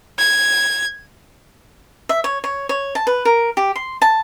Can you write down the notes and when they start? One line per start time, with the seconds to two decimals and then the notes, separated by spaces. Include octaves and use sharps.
0.18 G#6
2.09 E5
2.24 C#5
2.44 C#5
2.69 C#5
2.95 A5
3.07 B4
3.25 A#4
3.57 G4
3.76 C6
4.02 A5